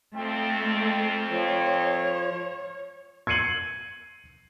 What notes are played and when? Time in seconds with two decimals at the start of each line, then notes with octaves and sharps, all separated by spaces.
0.14 F2 A3 C4 A4
1.31 F3 C#5
3.27 G#6 C7 C#7 D#7 F#7